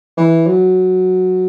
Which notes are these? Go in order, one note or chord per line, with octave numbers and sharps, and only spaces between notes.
E3
F#3